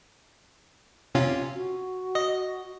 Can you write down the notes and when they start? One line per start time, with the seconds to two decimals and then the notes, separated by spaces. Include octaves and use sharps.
1.15 C3 C#4 F4
1.55 F#4
2.15 D#5